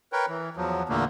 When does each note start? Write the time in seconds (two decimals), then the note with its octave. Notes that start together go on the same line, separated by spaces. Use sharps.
0.13 A#4 B4 C#5 G5
0.29 E3
0.57 E2 F3 F#3
0.89 E2 A#2 D3 A3 A#3